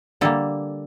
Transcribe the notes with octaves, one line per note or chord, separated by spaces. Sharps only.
D3 G3 A#3 A4